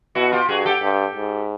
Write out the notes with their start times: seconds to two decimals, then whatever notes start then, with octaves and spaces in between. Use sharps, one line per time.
0.15 B2 E4 F#4
0.32 F4 G4
0.49 G2 F#4 G#4
0.66 G4 A4
0.82 G2
1.16 G#2